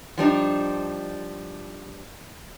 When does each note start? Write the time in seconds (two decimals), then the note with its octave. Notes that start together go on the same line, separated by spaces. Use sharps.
0.18 F3 G3 D4 D#4